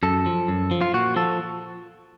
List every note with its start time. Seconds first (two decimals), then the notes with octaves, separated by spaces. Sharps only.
0.03 F#2 A4
0.26 F3
0.48 F#2
0.71 F3
0.81 F4
0.94 A#2 F#4
1.16 F3 A4